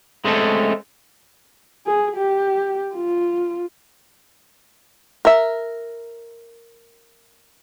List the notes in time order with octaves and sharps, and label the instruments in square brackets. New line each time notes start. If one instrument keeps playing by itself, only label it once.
[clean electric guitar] G#3 A3 C4 C#4 A4
[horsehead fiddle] G#4
G4
F4
[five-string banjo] A#4 E5